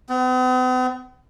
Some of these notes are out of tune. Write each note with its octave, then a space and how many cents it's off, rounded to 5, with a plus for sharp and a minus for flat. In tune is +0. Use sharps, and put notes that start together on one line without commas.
B3 +45